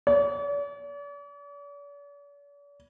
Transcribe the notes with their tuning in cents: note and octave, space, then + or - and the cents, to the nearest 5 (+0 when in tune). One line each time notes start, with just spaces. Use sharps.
D5 -45